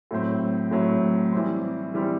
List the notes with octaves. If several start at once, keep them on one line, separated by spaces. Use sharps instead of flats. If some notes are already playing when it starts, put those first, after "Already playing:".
A2 F#3 C4
A2 F#3 C4
E3 G3 C4
E3 G3 C4